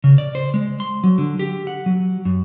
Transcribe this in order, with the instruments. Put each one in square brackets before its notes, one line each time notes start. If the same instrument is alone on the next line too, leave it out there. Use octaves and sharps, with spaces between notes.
[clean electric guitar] C#3
D5
C5
G#3
C6
F#3
D3
G4
F#5
F#3
F#2